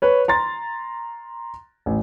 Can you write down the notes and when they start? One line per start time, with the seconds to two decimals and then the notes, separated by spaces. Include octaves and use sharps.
0.02 B4 C#5
0.28 A#5 C6 A6
1.86 A1